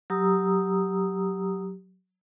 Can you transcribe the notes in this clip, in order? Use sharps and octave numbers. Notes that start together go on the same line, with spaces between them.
F#3 G4 A#5 D#6 E6